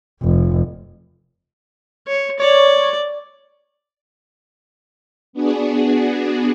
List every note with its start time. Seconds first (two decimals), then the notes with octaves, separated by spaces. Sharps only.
0.23 F1
2.08 C#5
2.40 C#5 D5
5.33 B3 D4 F#4 G#4